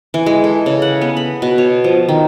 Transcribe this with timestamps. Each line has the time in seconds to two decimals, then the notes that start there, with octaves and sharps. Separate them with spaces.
0.14 E3
0.26 G#3
0.44 A4
0.66 C#3
0.82 F#5
1.01 B3
1.17 B5
1.42 B2
1.58 C#5
1.84 F3
2.09 D#3